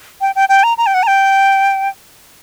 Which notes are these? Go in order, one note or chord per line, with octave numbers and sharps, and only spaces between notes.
G5
G5
G5
A#5
A#5
G5
F#5
A#5
G5